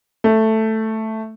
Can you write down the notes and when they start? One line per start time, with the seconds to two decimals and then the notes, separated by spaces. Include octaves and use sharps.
0.24 A3